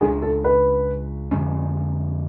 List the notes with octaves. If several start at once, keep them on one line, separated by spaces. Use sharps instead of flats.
C#2 C#3 G#3 D4 G#4
A4
B4
F2 D3 G#3 C#4